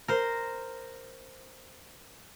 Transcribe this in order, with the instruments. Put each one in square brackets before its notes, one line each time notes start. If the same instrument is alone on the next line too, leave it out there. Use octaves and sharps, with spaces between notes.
[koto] A#4 C5